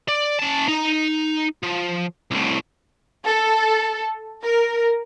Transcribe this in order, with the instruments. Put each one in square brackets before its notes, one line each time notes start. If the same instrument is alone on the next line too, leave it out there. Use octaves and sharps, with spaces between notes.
[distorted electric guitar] D5
C#4 A5
D#4 A#5
F3
C2 A2
[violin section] A4
A#4